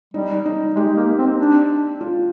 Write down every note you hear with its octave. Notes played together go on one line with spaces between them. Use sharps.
G3 D#4
D#4
G#3 G4
A#3
C4
D4
F4